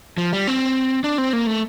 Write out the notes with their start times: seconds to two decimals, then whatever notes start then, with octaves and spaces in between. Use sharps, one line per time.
0.18 F3
0.33 G3
0.47 C4
1.04 D4
1.18 C4
1.33 A#3
1.47 A3